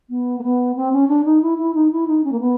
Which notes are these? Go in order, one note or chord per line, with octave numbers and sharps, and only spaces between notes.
B3
A#3
B3
C4
C#4
D4
D#4
E4
E4
D#4
E4
D#4
C#4
A#3
B3